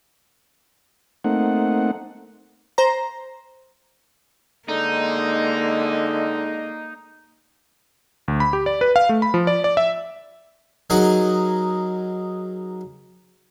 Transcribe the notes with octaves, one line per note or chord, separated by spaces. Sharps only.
A3 A#3 C4 D#4 F#5
C5 A#5
D3 G#3 A#3 D#4
D2
B5
G4
D5
B4
F5
A3
B5
F3
D5
D5
E5
F#3 D#4 G#4 A#4 D#5 F#5